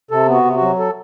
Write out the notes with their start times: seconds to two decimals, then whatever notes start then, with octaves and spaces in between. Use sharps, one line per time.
0.11 C3 A4
0.28 B3
0.33 F#4
0.45 C3
0.56 F#4
0.61 F#3
0.79 A4